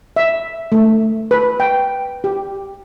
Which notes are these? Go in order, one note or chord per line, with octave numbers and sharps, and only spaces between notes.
E5
A3
B4
G5
G4